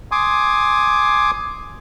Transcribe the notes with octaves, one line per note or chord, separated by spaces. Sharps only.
G#5 C6 D6 D#6